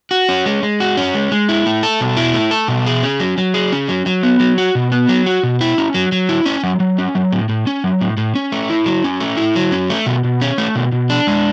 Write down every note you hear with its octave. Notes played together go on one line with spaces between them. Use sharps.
F#4
C#4
G#3
G#3
F#4
C#4
G#3
G#3
E4
A3
A4
B2
E4
A3
A4
B2
G#4
C#4
F#3
F#3
G#4
C#4
F#3
F#3
B3
F#3
F#4
B2
B3
F#3
F#4
B2
E4
C#4
F#3
F#3
E4
C#4
F#3
F#3
C#4
F#3
A2
A2
C#4
F#3
A2
A2
C#4
A3
E4
F#3
C#4
A3
E4
F#3
C#4
A3
B2
B2
C#4
A3
B2
B2
D4
G#3